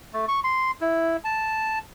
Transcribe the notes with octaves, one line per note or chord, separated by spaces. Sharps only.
A3
C#6
C6
E4
A5